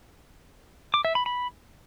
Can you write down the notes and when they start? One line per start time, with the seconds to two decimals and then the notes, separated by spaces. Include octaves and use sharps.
0.94 D6
1.05 E5
1.15 B5
1.26 B5